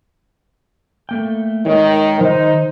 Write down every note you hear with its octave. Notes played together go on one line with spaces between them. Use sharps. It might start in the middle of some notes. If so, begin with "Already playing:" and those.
A3 A#3 G5
D#3 G#3 D#4 C#5
D#3 F3 D#4 C5